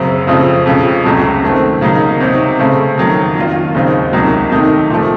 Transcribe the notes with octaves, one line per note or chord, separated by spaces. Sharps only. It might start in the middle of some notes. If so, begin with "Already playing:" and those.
Already playing: F#2 C#3 F#3 C4
F2 C#3 F3 C4
F2 C#3 F3
C#2 C3 F#3 A3
D#3 A3 C4
C#3 F#3 A#3 D#4
C3 F#3 C4 D#4
C#3 A3 C4
F2 D#3 F#3
D#3 A#3 F4
D#2 C#3 F#3 C4 D#4
C#2 C3 F#3 A#3 D#4
C3 D#3 A3 D#4
A#2 F3 A3